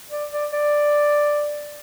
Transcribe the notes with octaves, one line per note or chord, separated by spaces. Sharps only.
D5
D5
D5